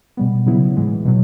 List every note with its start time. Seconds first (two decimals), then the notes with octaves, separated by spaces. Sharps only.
0.17 B2 G3 B3
0.46 C#3 F#3 B3 E4
0.76 A2 E3 G#3
1.05 B2 F#3